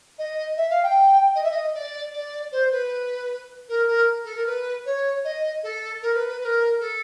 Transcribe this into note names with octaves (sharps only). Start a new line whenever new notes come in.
D#5
E5
F5
G5
D#5
E5
D#5
D5
D5
C5
B4
A#4
A#4
A4
A#4
B4
C#5
D#5
A4
A#4
B4
B4
B4
A#4
A4